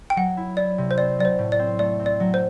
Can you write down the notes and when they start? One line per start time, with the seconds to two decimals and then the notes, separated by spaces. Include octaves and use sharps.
0.10 G5
0.16 F#3 F#5
0.37 E4
0.57 E4 D5
0.78 C3
0.91 C5
0.98 C4 D5
1.19 F#3 D5
1.25 C5
1.39 A2
1.52 D5
1.59 C4
1.79 A3 D5
1.99 C4
2.06 D5
2.20 F#3
2.34 C5